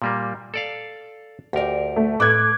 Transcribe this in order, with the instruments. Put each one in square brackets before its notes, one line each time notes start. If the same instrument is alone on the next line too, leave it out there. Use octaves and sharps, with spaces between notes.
[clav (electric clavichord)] A#2 G3 A#3
A4 D5 F5
[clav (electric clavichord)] D2 A#4 [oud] G4 D5
[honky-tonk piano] A3
[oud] A2 A4 B4 [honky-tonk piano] D6 F#6 G#6